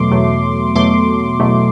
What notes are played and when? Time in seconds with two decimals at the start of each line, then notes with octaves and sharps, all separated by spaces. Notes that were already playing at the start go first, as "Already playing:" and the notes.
Already playing: E2 B2 F#3 A3 C6 D6
0.11 E2 B2 F#3 A3
0.75 E2 B2 F#3 A3 C6 D6
1.39 E2 B2 F#3 A3